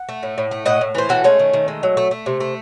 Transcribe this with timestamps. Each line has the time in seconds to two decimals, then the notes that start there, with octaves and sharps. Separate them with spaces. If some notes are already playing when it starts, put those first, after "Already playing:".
Already playing: F#5
0.09 A3
0.23 A2
0.38 A2
0.51 A3
0.66 A2 D#5 F#5
0.81 A2
0.95 E3 C5
1.09 A2 F#4 A4
1.24 G#3 A3 C#4
1.39 D#3
1.54 D#3
1.68 G#3
1.83 F#3
1.97 A3
2.11 A3
2.26 C3
2.40 A3